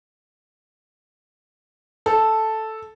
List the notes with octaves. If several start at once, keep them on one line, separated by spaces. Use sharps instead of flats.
A4